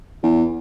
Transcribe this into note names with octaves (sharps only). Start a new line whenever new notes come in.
E2